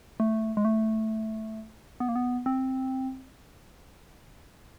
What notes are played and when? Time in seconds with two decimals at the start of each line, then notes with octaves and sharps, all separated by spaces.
0.20 A3
0.57 G#3
0.65 A3
2.00 B3
2.09 A#3
2.16 B3
2.46 C4